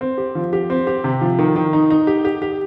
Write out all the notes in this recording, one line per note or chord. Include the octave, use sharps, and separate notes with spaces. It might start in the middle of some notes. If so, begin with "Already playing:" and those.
C4
G4
F3
G4
C4
G4
C3
F3
D#3
D#3
D#4
D#4
G4
G4
G4